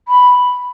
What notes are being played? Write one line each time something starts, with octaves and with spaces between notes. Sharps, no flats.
B5